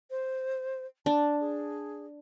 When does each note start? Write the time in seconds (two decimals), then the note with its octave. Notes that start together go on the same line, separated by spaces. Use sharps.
0.11 C5
1.06 D4 A5
1.40 G#4